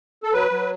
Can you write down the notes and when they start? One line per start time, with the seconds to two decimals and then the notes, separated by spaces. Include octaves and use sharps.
0.23 A4
0.33 F#3 B4
0.51 F#3